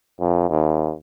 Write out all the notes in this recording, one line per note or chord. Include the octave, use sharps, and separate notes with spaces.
F2
D#2